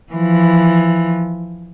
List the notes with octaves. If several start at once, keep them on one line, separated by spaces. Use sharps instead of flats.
E3 F3